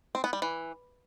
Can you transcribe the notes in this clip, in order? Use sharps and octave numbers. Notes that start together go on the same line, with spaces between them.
C4
B3
G3
E3